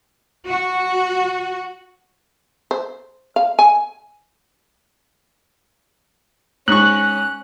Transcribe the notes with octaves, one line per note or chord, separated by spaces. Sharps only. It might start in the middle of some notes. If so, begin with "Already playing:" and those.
F#4
C5
F5
G#5
G#2 C#4 C#6 F#6